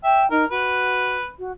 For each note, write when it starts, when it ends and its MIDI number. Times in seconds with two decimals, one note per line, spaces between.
0.04 0.23 76
0.04 0.29 79
0.31 0.45 63
0.31 0.44 70
0.50 1.18 66
0.50 1.27 71
1.39 1.52 66